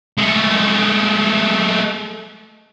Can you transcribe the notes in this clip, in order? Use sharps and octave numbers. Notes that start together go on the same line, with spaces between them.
G#3 A3